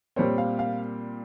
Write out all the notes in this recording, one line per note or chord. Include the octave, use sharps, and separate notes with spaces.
A#2 G3 C4 C#5
F5
F5